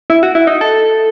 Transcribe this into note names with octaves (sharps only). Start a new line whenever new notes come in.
E4
F#4
E4
D#4
A4